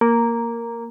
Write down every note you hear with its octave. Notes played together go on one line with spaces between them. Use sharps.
A#3